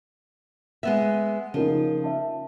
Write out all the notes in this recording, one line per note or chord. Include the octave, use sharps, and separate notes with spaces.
G#3 B3 E5
C#3 F3 A#3 D#4
E5 A5